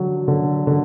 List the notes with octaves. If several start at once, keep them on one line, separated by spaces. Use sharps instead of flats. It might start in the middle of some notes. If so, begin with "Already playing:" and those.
Already playing: D3 F#3
D3
D3